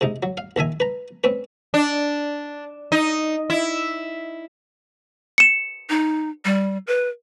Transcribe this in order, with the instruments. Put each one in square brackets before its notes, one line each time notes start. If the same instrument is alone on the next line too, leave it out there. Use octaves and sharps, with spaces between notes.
[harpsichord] C3 G#3 D#4
F#3
F5
A#1 D#3 E5 G#5
B4 A#5
C4 C#4 B4
[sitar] D4
D#4
E4
[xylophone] C#7 E7
[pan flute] D#4
G3
B4